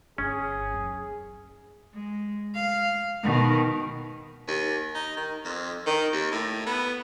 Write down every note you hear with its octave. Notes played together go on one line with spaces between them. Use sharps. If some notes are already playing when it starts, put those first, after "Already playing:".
G1 C#4 G#4
F#2
G#3
F5
B2 D#3
D#2
D#4
D#3
F2
D#3
D#2
A2
B3